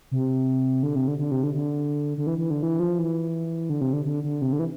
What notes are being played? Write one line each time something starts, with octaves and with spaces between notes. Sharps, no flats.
C3
D3
C3
D3
D3
C3
D3
D3
D3
E3
E3
D3
E3
F3
E3
D3
C3
D3
D3
D3
C3
D3
E3